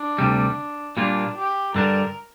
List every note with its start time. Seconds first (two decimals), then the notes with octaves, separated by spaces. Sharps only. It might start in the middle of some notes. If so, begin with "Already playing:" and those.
Already playing: D4
0.18 D2 C3 G3
0.96 A#2 G3 A#3 D4 F4
1.36 G4
1.74 G2 D3 G3 D4 A#4